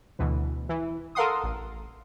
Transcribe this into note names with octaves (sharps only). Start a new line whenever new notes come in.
D2 B2 E3
E3
A4 A#4 F5 F#5 C6 D#6
A1